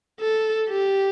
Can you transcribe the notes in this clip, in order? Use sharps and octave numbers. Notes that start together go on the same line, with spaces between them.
A4
G4